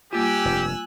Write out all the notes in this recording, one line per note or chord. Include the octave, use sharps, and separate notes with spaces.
G3 A#3 F4 G4 G#5 E6 F#6
F1 G2 F4